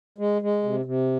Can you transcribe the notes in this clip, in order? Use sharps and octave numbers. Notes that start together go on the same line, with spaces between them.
G#3
G#3
C3
C3